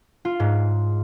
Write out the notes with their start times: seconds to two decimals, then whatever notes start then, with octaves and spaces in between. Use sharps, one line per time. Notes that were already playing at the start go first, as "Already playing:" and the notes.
0.25 F4
0.40 G#2